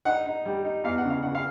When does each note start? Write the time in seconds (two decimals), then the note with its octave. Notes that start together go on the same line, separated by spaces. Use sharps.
0.05 D#4 F#5
0.26 D#4
0.45 G3
0.65 D#4
0.84 E2 F5
0.98 F#5
1.05 C#3
1.10 F5
1.22 C#3 F#5
1.35 F5